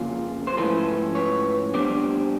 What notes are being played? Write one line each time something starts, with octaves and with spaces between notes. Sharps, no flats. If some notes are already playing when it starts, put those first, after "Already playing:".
Already playing: F2 C#3 A#3 C#4 F4
C5
G#2 F3 A3 C#4 E4 A4 B4
B4 C#5
A#2 G3 B3 D4 C5 D5